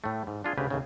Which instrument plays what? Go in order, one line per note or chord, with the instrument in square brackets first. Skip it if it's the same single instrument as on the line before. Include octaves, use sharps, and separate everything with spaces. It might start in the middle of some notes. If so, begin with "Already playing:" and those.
[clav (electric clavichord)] A2 A3
G#2
D4 F4 G#4
D2 C#3 G4 B4
D#2 A2 C#3